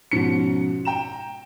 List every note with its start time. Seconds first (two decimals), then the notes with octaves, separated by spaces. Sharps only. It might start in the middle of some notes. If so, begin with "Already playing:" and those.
0.12 G#2 B2 F3 C#4 C#7
0.85 G5 A#5 E7